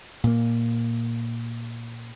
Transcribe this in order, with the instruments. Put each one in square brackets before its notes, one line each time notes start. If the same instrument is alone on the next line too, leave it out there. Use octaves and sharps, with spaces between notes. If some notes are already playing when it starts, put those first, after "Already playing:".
[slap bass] A#2 A#3